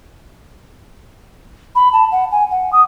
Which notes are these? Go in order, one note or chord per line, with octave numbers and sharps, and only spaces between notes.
B5
A5
F#5
G#5
F#5
D#6